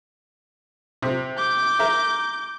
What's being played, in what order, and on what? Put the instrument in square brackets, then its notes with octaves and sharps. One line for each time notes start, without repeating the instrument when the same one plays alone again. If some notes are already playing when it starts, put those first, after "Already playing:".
[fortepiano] C3
[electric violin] D6 G6
[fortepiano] A#4 E5